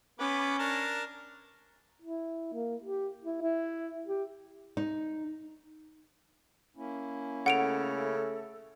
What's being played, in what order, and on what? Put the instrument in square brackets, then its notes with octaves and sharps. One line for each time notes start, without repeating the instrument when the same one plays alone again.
[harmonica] B3 B4 D6 [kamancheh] C#4
[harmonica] D4 A#4 A5
[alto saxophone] E4
A#3
G4
E4
E4
G4
[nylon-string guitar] D#4
[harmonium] A#3 C#4 E4
[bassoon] C#3 [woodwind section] A3 A4 [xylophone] F#5 D7 F7